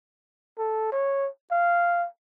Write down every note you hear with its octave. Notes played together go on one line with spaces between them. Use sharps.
A4
C#5
F5